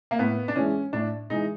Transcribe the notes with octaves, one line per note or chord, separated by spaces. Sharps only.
A#3
A2 B3
D4
E3 G#3 C#4
A2 D4
E3 G#3 D#4